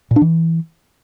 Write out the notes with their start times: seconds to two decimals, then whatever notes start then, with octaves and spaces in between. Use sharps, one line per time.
0.11 A#2
0.16 D4
0.21 E3